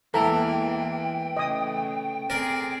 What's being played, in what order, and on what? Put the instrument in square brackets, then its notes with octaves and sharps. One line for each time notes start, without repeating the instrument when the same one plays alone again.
[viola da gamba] E2 G#3 A#3 [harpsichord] E3 [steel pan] A4 A#5 [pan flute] G5
[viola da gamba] C#3 A3 [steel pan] D#5 D#6
[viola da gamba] C4 G#4 [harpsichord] A#4 D5